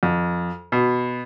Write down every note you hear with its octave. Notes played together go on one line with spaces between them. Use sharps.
F2
B2